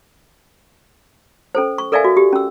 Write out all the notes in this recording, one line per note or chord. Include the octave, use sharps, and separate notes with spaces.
C#4 A4 C5
C#6
A4 A#4 D5 E5 F5 G#5
F#4
G4
C#4 E6